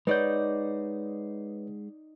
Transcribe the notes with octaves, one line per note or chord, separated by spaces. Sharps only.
G#3 D#4 G#4 B4 C#5 D5 F#5 G6